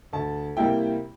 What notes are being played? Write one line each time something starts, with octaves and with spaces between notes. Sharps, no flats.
D2 A5
C3 G3 A#3 E4 G5